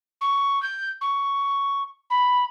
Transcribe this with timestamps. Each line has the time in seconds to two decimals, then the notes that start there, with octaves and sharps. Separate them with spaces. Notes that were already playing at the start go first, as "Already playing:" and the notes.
0.21 C#6
0.63 G6
1.01 C#6
2.10 B5